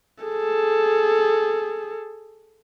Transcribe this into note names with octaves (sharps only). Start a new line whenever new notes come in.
G#4 A4